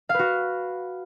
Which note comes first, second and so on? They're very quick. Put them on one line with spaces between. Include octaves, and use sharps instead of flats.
F5 B4 F#4